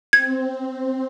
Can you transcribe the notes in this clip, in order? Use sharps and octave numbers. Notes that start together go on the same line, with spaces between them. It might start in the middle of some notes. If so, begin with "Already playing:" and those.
C4 G#6